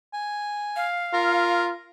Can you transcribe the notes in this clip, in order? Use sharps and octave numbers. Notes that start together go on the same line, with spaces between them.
G#5
F5
F4 A#4